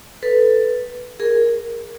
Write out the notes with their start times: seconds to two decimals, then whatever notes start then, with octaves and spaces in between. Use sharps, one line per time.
0.23 A4 B4
1.20 G#4 A#4